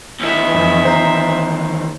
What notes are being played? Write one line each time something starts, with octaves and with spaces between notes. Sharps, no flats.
D#2 E3 D#5 E5
F2
C5 A#5